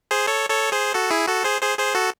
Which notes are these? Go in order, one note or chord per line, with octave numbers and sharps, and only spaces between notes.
G#4 C5
A4 C#5
A4 C#5
G#4 C5
F#4 A4
E4 G#4
F#4 A4
G#4 C5
G#4 C5
G#4 C5
F#4 A4